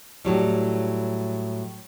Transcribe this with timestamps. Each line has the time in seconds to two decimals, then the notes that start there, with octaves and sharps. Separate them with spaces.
0.25 A2 F#3 G3